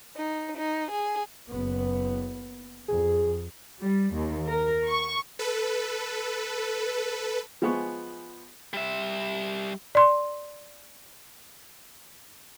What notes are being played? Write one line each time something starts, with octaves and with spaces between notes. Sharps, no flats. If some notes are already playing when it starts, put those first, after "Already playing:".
D#4
D#4
G#4
F#1 B3
F2 G#4
G3
D#2
A#4
C#6
A4 B4
F3 G#3 B3 G#4 C#6
G3 E5
D5 C6